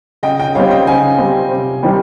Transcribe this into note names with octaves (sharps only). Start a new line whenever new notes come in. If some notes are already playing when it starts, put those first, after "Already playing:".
C#3 D#5 G5
D#5 G5
G3 C4 C#5 F5
D#5 G5
C#3 F5 G#5
G3 C4
C3
D#3 G3 C4